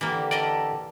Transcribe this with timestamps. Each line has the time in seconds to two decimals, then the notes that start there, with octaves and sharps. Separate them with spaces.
0.01 D3 E3 A#3 G4 D5
0.31 C#4 A4 D5 D#5 A#5